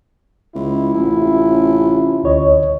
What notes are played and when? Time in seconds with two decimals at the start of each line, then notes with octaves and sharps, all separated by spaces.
0.55 C#2 E4
0.94 A1 C3 C#4 F4
2.24 D2 C#5 D#5